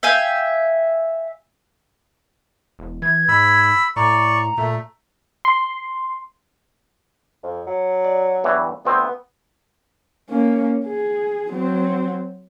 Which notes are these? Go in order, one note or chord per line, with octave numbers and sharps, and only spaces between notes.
E5 F5 G5 G#5
E1
E3 G#6
G#2 B5 E6
A2 D5 A#5 C#6
A#2 A3
C6
F2
F#3
D5
E2 G2 E3
D2 B3 C4
A#3 C#4
G#4
F#3 C4